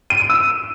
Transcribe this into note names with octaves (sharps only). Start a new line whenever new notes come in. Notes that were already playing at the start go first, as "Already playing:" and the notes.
D#7
D7
E6